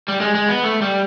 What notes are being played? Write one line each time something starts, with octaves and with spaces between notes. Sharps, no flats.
G3
G#3
G#3
B3
A3
G3